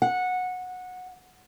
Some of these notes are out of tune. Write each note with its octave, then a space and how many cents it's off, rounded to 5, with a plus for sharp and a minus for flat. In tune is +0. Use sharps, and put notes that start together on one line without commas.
F#5 -15